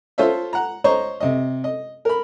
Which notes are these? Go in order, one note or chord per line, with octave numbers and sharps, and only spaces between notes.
F4 A4 C5 C#5 E5
F#5 A#5
C5 C#5 D#5 A#5 C#6
C3 D#5
D#5
A#4 B5